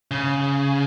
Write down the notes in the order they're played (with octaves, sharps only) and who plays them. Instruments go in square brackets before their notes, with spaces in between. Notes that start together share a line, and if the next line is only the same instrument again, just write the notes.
[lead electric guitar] C#3